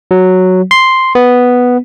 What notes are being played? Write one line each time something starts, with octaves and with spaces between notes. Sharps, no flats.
F#3
C6
B3